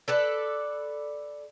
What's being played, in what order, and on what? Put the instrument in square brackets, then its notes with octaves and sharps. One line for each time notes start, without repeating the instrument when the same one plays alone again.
[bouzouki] A4 B4 D5